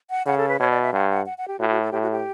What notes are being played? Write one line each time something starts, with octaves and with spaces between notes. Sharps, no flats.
F#5
C#3 F#5
A4
B4
B2 C#5
D5
E5
G2 F#5
F#5
F#5
F#5
G4
A2 F#4
F#4
A4
A2 G4
F#4
G4